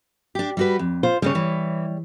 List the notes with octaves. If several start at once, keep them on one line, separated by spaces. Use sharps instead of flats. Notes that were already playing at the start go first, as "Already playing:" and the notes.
D4 G4
G3 F#4 B4
F2
F4 C5
C#3 G3 G#3 C#5
E3